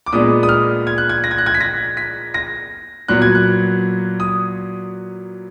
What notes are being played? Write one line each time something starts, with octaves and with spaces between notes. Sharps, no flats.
D6
A#2 G#3 B3 D4 D#6
D#6
F6
G#6
F#6
G#6
A#6
G#6
F#6
G#6
B6
A#6
B6
A#6
A#2 F#3 B3 F#6
G#6
F#6
D#6